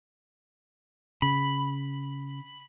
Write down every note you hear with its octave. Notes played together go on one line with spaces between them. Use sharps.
C#3 B5